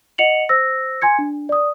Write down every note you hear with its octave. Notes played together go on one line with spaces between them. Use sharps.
D#5 F#5 C#7 F7 F#7
C5 E6 A#6
G#5 C6 G#6 C#7
D4
D5 D#6